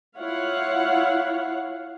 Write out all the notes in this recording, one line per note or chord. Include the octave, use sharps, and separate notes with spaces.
E4 F4 C#5 F5 F#5